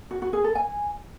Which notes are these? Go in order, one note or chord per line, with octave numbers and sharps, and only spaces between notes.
F#4
F#4
G#4
A4
G#5